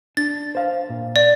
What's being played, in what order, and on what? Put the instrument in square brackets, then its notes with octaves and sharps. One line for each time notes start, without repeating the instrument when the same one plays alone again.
[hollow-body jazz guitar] D4 [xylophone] A6
[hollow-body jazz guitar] C5 F5
A#2
[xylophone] D5